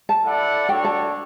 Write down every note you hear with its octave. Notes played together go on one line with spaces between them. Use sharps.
A5
E4 A4 D5 F#5
D4 F#4 A4 C#5 G5
A5